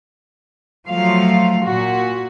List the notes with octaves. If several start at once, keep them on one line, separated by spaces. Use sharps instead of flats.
F3 F#3 A3 F5
A#2 F#4